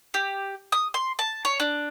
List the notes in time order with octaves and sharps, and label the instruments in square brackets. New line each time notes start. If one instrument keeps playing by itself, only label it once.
[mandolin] G4
D#6
C6
A5
C#5
D4